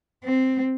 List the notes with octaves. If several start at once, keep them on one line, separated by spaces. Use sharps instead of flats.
C4